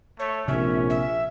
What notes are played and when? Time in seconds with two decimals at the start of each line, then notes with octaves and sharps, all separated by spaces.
0.19 A3 C#5
0.48 A#1 C3 C4 C#4 E5
0.90 E5